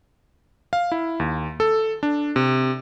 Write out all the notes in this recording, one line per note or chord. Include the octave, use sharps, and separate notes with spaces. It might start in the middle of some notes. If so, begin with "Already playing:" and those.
F5
E4
D#2
A4
D4
C3